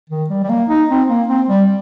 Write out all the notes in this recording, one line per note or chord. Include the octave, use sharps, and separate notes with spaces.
D#3
G3
G3
A#3
D#4
C4
A#3
C4
G3